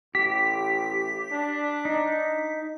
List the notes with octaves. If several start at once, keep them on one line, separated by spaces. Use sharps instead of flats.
A1 G4 B6
D4
D#4